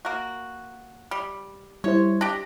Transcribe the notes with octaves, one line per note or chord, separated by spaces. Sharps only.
A#3 F#4
G3
G3 E4 C5 C#5
D4 G4 A#6